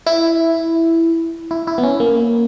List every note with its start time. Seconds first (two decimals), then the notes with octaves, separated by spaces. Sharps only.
0.07 E4
1.51 E4
1.67 E4
1.78 B3
1.83 C#4
2.00 A#3